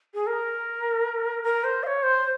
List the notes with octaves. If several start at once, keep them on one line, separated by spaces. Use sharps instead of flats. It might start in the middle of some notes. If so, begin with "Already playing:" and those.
G#4
A#4
A#4
C5
F5
C#5
C5